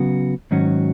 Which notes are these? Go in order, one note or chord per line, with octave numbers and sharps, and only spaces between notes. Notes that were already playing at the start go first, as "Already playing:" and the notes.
Already playing: C#3 F#3 B3 F#4
G#2 D#3 F#3 C#4 F#4